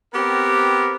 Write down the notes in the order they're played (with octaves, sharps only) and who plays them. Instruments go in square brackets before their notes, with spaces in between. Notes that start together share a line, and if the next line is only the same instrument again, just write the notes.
[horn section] B3 C4 G4 A#4